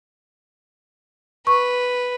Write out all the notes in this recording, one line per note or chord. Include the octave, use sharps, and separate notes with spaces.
B4 C#6